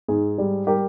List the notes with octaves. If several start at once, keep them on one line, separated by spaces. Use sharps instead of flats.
G#2 G#4
G3
G3 G4 A#4